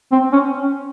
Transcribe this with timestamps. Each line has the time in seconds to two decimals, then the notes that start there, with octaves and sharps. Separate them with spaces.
0.12 C4
0.33 C#4